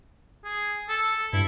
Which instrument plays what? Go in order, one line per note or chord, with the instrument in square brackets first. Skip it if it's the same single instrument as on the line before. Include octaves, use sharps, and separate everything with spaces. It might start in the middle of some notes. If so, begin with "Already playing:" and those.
[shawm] G#4
A4
[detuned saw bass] G2 [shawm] E4